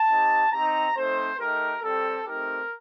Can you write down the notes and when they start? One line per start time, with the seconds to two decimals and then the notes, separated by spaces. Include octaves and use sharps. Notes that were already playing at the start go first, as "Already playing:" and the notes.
Already playing: A5
0.09 C4 D#4 G4
0.52 C4 D#4 G4 A#5
0.95 A3 C4 D#4 C5
1.39 A3 D#4 G4 A#4
1.83 G3 C4 G4 A4
2.26 A3 C4 D#4 G4 A#4